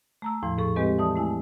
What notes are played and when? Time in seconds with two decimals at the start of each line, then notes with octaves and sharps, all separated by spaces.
0.22 A3 A#5 E6
0.43 E2 A2 F3
0.58 G#2 A4 C#6
0.76 G#3 C4 G4 B4 D#5
0.99 E3 D5 A5 D#6
1.16 A3 E4 G#5